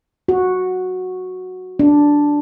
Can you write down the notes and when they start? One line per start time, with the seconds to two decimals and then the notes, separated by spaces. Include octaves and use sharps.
0.28 F#4
1.79 D4